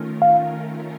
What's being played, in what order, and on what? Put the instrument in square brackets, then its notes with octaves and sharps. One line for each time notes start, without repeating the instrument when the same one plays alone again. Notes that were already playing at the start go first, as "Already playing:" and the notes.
Already playing: [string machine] D#3 A3 C#4 F4 A#4
[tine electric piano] F5